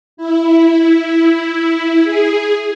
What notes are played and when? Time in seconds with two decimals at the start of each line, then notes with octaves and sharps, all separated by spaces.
0.17 E4
2.04 G#4